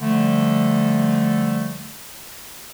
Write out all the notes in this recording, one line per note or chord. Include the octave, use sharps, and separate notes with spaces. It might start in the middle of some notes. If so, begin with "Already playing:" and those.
D3 F3 G3 A3